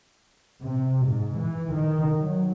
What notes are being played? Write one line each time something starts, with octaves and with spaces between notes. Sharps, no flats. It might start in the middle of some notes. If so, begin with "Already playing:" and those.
C3
G#2
E3
D#3
F#3